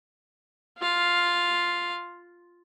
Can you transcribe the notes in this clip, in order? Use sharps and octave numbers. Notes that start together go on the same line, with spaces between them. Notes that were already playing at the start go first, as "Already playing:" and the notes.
F4 F5